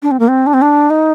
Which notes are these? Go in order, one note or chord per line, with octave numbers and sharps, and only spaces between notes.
D4
C4
A#3
C4
D4
C4
D4
D#4